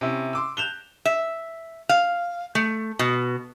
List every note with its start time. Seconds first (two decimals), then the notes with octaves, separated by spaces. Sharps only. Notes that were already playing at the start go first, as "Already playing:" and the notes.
0.01 C3 C#4 E4
0.33 C6 D6 E6
0.57 F#6 G6 E7 F7 G7
1.05 E5
1.89 F5
2.55 A3
2.99 B2